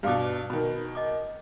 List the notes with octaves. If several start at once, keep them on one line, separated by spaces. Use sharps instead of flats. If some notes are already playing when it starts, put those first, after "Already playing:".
G2 B2 G4 F5 D6
B2 D#3 B5
D#5 D6